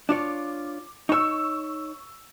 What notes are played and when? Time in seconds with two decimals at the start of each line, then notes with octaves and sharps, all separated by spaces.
0.09 D4 F4 C#5 D6
1.09 D#4 C#5 C#6 E6